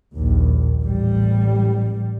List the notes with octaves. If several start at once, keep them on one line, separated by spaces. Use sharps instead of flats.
A#1 D#2
A1 G3